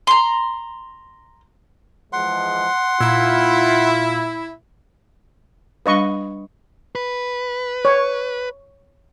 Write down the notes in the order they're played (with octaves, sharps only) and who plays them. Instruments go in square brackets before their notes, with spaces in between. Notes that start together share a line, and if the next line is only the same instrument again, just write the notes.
[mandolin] A#5 C6
[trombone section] E3 F3 G#3 [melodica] F#5 C6
[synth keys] A#2 E6 G#6 [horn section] E4 [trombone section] F4
[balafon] G3 D4 F5 [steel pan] B4 D#5 C#6
[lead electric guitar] B4
[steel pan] C#5